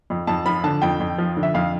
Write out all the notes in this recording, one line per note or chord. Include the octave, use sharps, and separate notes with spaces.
F2
F2 A5
F3 B5
D3 A5
F2 G5
F2
F3
D3
E5
F2 F5